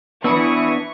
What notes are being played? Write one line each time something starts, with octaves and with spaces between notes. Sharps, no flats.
E3 B3 D4 E4 C#6 D#6